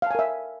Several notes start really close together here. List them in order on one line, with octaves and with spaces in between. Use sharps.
F5 A5 G#5 A#4 E5